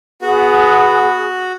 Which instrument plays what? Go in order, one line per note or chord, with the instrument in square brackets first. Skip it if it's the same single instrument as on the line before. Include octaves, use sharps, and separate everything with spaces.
[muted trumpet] B3 [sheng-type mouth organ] F#4 [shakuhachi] G#4